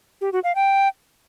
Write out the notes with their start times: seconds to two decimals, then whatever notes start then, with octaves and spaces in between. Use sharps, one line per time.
0.21 G4
0.32 F#4
0.44 F5
0.55 G5